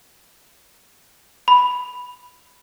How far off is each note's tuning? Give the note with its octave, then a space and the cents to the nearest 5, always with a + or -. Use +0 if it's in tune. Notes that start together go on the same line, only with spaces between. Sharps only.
B5 +0